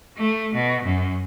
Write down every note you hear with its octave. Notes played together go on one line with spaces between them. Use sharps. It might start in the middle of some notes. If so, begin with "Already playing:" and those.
A3
B2
F#2